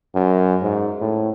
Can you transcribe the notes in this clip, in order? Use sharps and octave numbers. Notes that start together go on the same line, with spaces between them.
F#2
G#2
A2